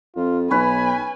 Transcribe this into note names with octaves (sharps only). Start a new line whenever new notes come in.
F2 F4
B1 C#4 B4 G#5 B5